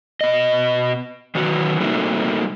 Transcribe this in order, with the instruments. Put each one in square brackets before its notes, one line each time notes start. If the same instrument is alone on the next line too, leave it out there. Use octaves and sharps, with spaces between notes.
[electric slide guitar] B2 D#5
D#3 E3 F#3 B3 F#4
G3 A3 A#3 C4 D#4 F#4